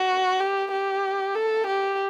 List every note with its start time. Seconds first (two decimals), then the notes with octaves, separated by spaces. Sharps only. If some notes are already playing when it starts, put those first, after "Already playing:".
Already playing: F#4
0.41 G4
0.71 G4
1.35 A4
1.67 G4